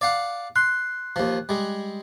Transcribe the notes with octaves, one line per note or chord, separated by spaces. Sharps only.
D5 F5 F#5
C6 F#6
D#2 F3
G3 G#3